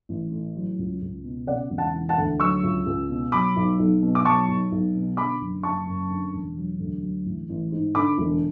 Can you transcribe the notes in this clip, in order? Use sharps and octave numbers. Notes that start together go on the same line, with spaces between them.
A1
A2
F#3
C#2
C#2
B2
C#3 D5 F#5
E1
F#5 A5
E3
F#5 A5
D2
F#3 C#6 E6
C#2
C#2
B2
F#3 B5 D6
B1
B1
B2
D6
F#3 A5 C#6
B1
B1
B2
D3 B5 D6
F#1
F#1 A5 C#6
F#2
D3
E1
F#3
D2
F#3
A1
A1
G#2
D3 B5 D6
E1